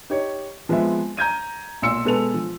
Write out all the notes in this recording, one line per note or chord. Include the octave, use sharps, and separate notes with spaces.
D#4 G4 C#5
F3 G#3 B3 C4 E5
A#5 G6 G#6 D#7
B1 A#2 C6 E6 C#7
B2 G#3 A4 B4 F7
F3